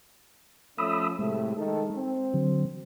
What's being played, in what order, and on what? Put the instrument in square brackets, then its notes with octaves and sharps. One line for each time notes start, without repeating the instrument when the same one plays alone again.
[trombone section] F3 A3 C#4 [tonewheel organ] B5 D#6 E6
[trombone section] A2 C3 A3 [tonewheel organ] G#3
[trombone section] D#3 A4
C4
[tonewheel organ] D3 F#3